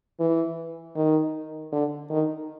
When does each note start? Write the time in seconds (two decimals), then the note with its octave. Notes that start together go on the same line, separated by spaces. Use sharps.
0.20 E3
0.96 D#3
1.72 D3
2.10 D#3